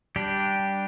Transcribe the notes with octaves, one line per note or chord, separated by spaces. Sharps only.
G3 D4 G4